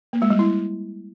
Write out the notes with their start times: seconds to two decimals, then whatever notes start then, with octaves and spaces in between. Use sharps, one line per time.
0.13 A#3
0.22 G#3
0.30 G3
0.39 E4